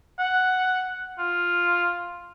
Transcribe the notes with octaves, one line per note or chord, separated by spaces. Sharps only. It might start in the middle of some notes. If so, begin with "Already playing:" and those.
F#5
F4